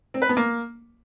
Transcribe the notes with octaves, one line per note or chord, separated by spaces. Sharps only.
C4
B4
B3
A#3